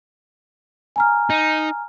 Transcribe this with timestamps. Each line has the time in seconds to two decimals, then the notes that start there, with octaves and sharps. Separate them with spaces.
0.96 G#5 A#5 F6
1.30 D#4